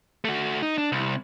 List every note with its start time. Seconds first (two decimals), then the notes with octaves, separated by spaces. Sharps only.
0.25 A3 F#4
0.62 D#4
0.78 D4
0.92 C2